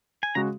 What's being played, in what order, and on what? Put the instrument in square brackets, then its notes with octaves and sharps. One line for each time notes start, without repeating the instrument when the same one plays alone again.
[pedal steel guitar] G#5
[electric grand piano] C#3 G#3 F#4 [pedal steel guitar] A#5